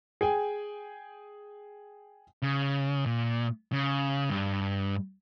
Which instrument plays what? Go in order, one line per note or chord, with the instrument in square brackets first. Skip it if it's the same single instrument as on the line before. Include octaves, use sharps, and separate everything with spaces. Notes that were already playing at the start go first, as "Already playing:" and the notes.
[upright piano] G#4 G5 G#5
[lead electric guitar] C#3
A#2
C#3
G2